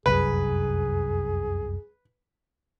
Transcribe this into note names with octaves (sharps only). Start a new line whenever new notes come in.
F1 C2 F#2 G#4 B4